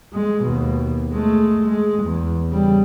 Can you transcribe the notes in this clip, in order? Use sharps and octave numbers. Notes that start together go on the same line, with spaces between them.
G#3
D#2 B2
G#3 A3
G#3
E2
C#3 G3